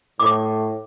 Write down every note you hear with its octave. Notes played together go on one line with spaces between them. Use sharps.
A2 D6